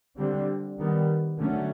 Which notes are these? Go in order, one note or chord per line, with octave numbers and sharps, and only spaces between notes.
D3 G3 C4
D#3 G3 B3
D3 F#3 A3 C#4